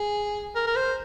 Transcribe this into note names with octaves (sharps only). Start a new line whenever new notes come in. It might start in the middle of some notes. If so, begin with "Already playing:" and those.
Already playing: G#4
A#4
A#4
C5